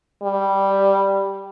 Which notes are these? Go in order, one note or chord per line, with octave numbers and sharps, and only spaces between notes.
G3